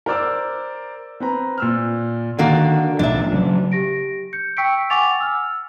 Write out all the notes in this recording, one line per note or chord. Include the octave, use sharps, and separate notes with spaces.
A#4 C5 D5 D6 E6
C4 B4 A#5
A#2 E6 F6
D3 D#3 A#3 F#4
B1 A2 F3 D4 E5
C#3 F#3
G4 A#6 D7
G6 C#7
G5 C#6 E6 B6 C#7 D7
F#5 G#5 C#6 D6 A6 F7
E6 F6